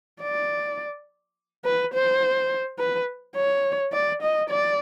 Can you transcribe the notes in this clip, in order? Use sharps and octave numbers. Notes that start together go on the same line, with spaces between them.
D5
B4
C5
B4
C#5
D5
D#5
D5